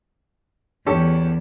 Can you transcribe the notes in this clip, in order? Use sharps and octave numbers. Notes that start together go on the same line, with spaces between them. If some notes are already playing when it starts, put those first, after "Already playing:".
E2 C#4 G4 A4